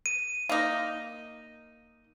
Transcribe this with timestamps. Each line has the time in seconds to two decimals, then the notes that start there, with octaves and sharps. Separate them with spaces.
0.06 D#7
0.49 A#3 D#4